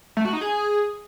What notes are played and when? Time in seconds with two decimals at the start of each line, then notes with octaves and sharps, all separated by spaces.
0.17 A3
0.25 F#4
0.33 D#4
0.41 G#4